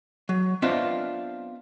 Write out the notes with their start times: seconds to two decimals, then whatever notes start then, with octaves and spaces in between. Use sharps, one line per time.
0.29 F#3
0.62 B3 C4 D4 F4 D#5 E5